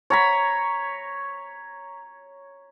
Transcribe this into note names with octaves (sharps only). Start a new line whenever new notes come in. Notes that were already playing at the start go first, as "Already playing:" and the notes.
C#5 A#5 B5